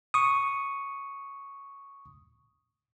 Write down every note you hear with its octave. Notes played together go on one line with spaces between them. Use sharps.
C#6 D#6